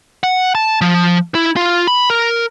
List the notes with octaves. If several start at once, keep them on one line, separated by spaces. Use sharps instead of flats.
F#5
A5
F3
E4
F4
B5
A#4